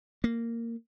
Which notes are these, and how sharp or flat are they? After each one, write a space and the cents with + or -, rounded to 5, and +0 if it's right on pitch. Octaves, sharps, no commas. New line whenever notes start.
A#3 -10